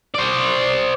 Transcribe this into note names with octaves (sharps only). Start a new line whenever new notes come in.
C5 D5